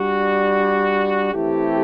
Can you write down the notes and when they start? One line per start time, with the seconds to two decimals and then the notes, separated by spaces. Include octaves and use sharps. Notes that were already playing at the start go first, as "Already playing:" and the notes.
Already playing: G3 D4 F#4
1.32 E3 A3 C4 E4 G4